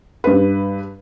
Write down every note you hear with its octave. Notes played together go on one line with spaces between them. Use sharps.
G2 B4